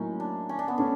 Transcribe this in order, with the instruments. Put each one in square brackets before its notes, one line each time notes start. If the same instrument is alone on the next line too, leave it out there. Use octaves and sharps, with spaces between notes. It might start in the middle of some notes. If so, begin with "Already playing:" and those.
Already playing: [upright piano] A2 F#3 A#3 [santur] C#4 D#4
[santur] D4
C#4
D4
B3
[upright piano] A3 C#4 [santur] D4